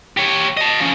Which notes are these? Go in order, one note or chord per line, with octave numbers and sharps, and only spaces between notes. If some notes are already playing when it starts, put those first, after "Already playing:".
G4 C#5
D#5 A5
F3 C#4